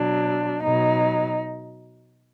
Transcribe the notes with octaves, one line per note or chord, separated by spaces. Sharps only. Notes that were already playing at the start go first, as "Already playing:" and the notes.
Already playing: B2 F#3 D4
B2 F#3 D#4